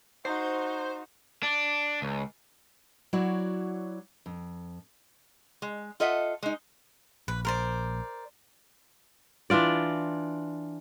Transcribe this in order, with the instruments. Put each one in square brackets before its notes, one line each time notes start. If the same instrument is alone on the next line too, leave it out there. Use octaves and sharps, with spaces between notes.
[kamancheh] D#4 F#4 [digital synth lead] C5
[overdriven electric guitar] D4
C#2
[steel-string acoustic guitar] F#3 E4 F#4 C#5 D5
F2
[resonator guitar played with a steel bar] G#3
F4 A4 D#5 E5 F#5
G#3 D#4
[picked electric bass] A#1 [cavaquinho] B4
[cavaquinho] A#4 C5 D5
[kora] E3 D4 F4 D5